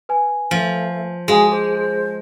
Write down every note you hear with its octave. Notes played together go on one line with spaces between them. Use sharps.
B4 G#5
F3 A3
G#3 F#4 G#4 F5 G#5
G#4 C5